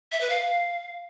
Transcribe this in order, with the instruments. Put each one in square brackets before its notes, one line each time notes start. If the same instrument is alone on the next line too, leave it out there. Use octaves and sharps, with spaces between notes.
[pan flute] E5
B4
F5